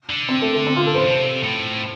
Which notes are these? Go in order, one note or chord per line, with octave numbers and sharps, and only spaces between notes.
D3
C4
A3
A3
C4
F4
A4
A2 C5
C3
A2